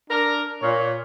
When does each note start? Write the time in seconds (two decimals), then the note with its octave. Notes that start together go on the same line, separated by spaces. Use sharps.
0.10 D4 A#4
0.62 A#2 C#5